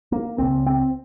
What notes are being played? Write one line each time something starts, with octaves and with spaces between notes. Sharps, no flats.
A#3
C#2 C#3 C4
C4